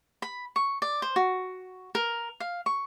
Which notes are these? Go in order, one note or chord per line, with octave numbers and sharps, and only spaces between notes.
B5
C#6
D5
C5
F#4
A#4
F5
C#6